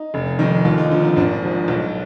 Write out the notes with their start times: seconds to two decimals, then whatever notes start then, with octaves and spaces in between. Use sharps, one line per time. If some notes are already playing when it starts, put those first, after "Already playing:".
Already playing: D#4
0.14 F1
0.39 F2 D#3
0.65 D#2 F4
0.78 D#4
0.91 D3 F3
1.04 D#4
1.16 G#1 D4
1.42 G#2 F3
1.68 B1